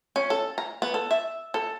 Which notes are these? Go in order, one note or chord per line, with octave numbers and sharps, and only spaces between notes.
C#4
A4
A#5
B3
A4
E5
A4